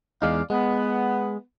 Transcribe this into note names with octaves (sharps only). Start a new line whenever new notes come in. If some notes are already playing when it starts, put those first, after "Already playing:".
E2 G#3 D#4 D5 F5
G#3 B3